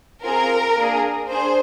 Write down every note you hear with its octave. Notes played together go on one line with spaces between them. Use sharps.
C4 F4 G#4 A#4
A#3 D4 G#4
D4 G#4 C5